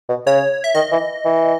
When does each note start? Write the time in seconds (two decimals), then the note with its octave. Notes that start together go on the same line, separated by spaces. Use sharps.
0.09 B2
0.26 C#3 C#5
0.64 E5
0.75 D#3 D#5
0.92 E3
1.25 E3